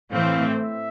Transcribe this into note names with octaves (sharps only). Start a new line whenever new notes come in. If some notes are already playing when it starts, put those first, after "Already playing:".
A2 E3 A3 C4 F5
E5